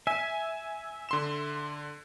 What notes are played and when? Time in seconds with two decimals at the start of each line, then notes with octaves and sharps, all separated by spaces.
0.07 E5 G#5
1.09 D3 C6 E7